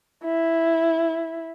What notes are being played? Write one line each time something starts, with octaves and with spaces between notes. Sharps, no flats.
E4